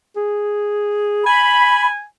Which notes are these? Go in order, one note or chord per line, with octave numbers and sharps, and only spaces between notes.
G#4
G#5 B5